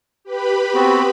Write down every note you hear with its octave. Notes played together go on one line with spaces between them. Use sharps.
G4 B4 B5
B3 C4 F#4